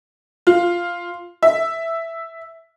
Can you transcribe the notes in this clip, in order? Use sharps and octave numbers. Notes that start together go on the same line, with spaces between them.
F4
E5